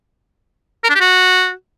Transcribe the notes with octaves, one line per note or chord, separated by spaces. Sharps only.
A#4
D4
G4
F#4